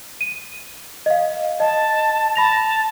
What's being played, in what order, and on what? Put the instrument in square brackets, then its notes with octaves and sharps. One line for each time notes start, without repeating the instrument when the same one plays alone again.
[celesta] D#7
D#5 F5
[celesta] D#5 [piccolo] A5
[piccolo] A5 [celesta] B5 A#6 F7